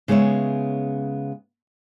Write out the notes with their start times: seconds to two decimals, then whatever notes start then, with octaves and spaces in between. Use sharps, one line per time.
0.08 C#3 G#3 B3 C#5 E5